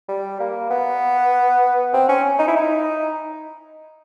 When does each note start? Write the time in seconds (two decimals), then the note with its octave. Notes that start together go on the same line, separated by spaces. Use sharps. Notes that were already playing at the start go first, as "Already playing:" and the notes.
0.09 G3
0.40 A#3
0.70 B3
1.93 C4
2.09 C#4
2.39 D#4
2.48 E4
2.56 D#4